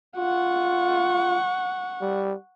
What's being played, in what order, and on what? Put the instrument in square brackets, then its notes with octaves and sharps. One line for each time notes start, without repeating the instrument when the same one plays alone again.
[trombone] F4 [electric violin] F#5 C#6
[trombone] G3